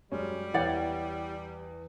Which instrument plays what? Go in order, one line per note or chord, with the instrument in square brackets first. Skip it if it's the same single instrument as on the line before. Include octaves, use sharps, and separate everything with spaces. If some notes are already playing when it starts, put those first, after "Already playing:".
[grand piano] F#2 G#3 C#4 [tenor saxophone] G3
[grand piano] E2 [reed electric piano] E4 G5 [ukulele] C#5 D5 F#5